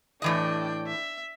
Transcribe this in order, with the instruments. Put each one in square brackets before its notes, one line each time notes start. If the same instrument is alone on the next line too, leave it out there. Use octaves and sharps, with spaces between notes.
[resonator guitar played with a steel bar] A2 E3 D#5 [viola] D4 G5
[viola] E5